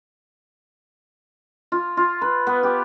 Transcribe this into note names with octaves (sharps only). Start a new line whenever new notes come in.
F4
F4
B4
B3
G4